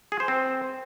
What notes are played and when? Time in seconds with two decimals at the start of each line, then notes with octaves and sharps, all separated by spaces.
0.12 G#4
0.20 C5
0.28 C4